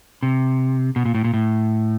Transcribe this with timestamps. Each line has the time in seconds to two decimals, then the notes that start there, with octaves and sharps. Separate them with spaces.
0.23 C3
0.96 B2
1.05 A#2
1.14 A2
1.24 A#2
1.34 A2